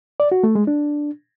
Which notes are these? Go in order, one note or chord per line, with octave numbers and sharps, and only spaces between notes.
D5
F#4
A3
G#3
D4